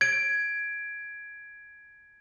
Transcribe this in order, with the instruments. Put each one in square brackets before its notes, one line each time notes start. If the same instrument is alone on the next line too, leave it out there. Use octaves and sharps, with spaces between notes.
[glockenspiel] G#6 D7